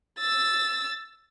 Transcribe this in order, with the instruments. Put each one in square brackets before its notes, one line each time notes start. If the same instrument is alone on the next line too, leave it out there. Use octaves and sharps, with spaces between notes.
[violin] E6 A6